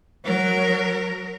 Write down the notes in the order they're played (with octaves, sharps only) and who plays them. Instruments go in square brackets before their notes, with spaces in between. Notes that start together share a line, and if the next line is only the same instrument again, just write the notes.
[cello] F#3 A#4